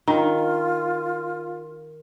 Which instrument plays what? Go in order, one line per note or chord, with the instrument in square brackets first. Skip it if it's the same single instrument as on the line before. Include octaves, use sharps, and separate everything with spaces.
[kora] D#3 [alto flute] F4